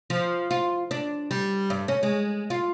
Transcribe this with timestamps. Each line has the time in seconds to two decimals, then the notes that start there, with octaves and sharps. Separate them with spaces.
0.10 F3
0.51 F4
0.91 D4
1.31 G3
1.70 G2
1.88 C#4
2.03 G#3
2.50 F4